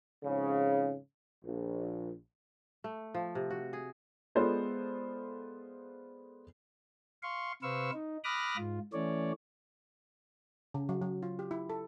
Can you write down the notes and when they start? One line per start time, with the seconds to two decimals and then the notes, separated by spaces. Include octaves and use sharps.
0.24 F2 G#2 C#3
1.44 A#1
2.84 A3
3.14 F3
3.35 C3
3.50 F#4
3.73 G#4
4.35 G#3 B3 F4 A4 C5 D5
7.23 F5 C6 C#6
7.63 C3 B4 C5 F5 C#6 E6
7.93 D#4
8.24 B5 D6 D#6 F6 F#6 A#6
8.57 G#2 F4
8.93 E3 A3 C#4 C#5 D5
10.74 C#3
10.89 F#3
11.02 F#3
11.23 F4
11.39 G4
11.51 E4
11.70 A4